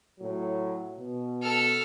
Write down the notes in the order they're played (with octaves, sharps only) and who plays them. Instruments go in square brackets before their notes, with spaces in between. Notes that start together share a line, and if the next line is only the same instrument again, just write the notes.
[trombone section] A2 F#3
B2
[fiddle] A4 F6